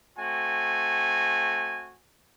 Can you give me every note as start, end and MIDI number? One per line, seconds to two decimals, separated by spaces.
0.18 1.96 57
0.18 1.96 60
0.18 1.96 66
0.18 1.96 80